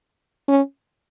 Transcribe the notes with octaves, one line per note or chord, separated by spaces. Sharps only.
C#4